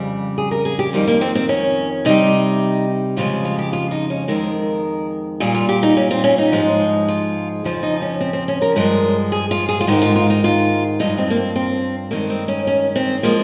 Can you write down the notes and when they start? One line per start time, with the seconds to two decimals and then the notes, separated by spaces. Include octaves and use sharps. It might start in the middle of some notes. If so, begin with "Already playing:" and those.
Already playing: F2 C#3 G3
0.38 G#4
0.51 A#4
0.65 G#4
0.79 G4
0.93 F2 D#3 G3
1.07 A#3
1.21 C4
1.35 C4
1.49 C#4
2.05 C3 G3 D#4
3.16 F2 C#3 F3 G#3 F4
3.45 F4
3.58 G4
3.73 F4
3.91 D#4
4.10 C#4
4.28 F2 D#3 G#3 A#4
5.40 A#2 G3 G#4
5.54 F4
5.69 G4
5.83 D#4
5.97 C#4
6.11 C4
6.24 C#4
6.38 D#4
6.52 G#2 F3 G#3
7.08 F4
7.64 F2 C#3 F3
7.83 D#4
8.02 C#4
8.20 C4
8.33 C4
8.48 C#4
8.62 A#4
8.76 G2 F3 G#3 A#4
9.32 G#4
9.51 F4
9.69 G#4
9.81 F4
9.87 G#2 D#3 G#3 G4
10.02 F4
10.16 F4
10.30 D#4
10.44 F4
10.99 G2 F3 G#3 D#4
11.18 C4
11.30 A#3
11.36 C4
11.56 C4
12.11 G2 D#3 G#3 A#3
12.30 C4
12.48 C#4
12.67 C#4
12.96 C4
13.23 F3 G#3 A#3